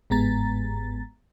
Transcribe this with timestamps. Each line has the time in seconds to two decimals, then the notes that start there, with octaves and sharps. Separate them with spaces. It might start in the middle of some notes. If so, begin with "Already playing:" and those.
0.10 G1 G#2 G#3 B3 A#5 A6